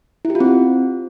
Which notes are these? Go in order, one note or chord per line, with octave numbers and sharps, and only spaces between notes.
E4
G4
F4
C4